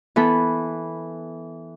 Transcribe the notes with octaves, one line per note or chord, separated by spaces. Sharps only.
E3 B3 A4 B5